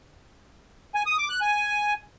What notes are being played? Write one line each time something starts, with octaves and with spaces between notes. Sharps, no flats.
G#5
D#6
D6
F#6
G#5